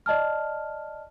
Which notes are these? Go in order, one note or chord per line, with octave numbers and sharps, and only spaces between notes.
D5 D#5 A5 F6